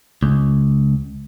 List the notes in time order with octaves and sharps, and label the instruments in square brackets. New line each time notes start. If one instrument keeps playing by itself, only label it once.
[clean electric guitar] C#2